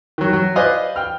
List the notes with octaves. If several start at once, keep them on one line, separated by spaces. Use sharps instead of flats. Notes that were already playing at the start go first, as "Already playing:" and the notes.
D#3 F#3
F#3
B4 C5 D5 D#5 F5 G#5
G5 F6